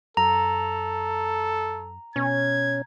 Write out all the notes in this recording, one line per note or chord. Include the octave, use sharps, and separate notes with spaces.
F#2 A4 A#5
B2 C#4 G#6